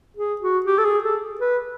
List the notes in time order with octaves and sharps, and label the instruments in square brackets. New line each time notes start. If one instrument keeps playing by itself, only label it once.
[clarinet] G#4
F#4
G4
A4
G#4
A4
B4